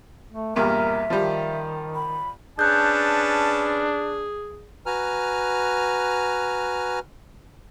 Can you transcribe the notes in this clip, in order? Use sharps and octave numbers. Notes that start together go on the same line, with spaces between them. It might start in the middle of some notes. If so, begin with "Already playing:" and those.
A3
E2 G2 A#2 A#4 E5
D#3 F3 G3
B5
C#4 D4 G#4 B4 A5 F#6 G6
F#4 B4 G#5 A#5 F6